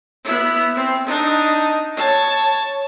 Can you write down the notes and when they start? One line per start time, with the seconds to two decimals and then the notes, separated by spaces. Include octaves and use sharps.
0.25 B3 E4
0.75 C4
1.07 D4 D#4
1.97 C#5 A5